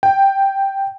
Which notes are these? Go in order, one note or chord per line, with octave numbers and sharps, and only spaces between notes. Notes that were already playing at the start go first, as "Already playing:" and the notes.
G5